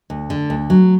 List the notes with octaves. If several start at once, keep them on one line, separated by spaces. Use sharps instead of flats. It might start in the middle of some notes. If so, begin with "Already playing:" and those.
D2
D3
D2
F#3